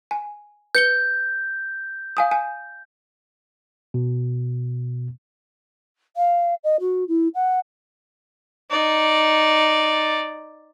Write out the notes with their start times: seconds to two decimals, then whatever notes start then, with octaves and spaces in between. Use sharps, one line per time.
0.11 G#5
0.75 B4 G6 C#7 G7
2.17 F5 G#5 D#6
2.31 G#5
3.94 B2
6.16 F5
6.63 D#5
6.80 F#4
7.08 E4
7.34 F#5
8.71 D#4 D5